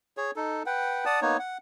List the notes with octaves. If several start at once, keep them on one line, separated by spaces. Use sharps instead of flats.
G#4 C#5
D#4 A4
B4 F#5 G5
D5 F#5 A5 D#6
A#3 B3 D#4 C#5
F#5